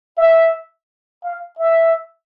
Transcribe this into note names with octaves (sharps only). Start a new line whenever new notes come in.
E5
F5
E5